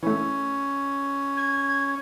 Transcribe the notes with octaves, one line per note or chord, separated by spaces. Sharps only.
E3 A3 C#4
G#6